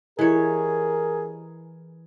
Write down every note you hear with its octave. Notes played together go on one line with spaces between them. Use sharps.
E3 E4 G4 G#4 A#4 C#5 D#5